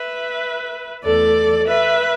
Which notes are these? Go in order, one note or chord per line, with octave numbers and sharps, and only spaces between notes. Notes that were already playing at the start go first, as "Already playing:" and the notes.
Already playing: B4 E5
E2 E3 A3 A4 D5
B4 E5